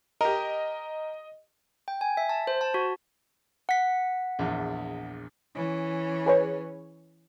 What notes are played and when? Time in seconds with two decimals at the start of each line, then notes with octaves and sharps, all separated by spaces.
0.21 G4 A#4 D#5
1.88 G5
2.01 G#5
2.17 E5
2.29 A5
2.47 C5
2.61 A5
2.74 F#4
3.69 F#5 B6
4.39 A#1 E2
5.55 E3 C#4
6.26 G#4 B4 C#5